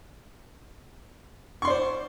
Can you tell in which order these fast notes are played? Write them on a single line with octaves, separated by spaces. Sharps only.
C#6 C6 D5 C5